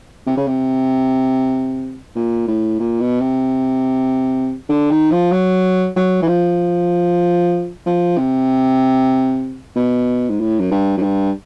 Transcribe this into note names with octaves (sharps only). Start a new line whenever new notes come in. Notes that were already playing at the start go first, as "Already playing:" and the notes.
C3
C#3
C3
A#2
A2
A#2
B2
C3
D3
D#3
F3
F#3
F#3
E3
F3
F3
C3
B2
G#2
A2
F#2
G2
F#2
G2